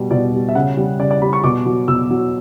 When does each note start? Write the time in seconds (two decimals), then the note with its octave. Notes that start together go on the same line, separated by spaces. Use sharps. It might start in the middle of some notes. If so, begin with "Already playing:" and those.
Already playing: B2 G3
0.11 B2 D5
0.33 G3
0.49 E5
0.55 C#3 F#5
0.77 G3
0.99 C#3 D5
1.11 D5
1.21 G3 B5
1.33 C#6
1.44 B2 D6
1.66 F#3
1.88 B2 E6
2.10 F#3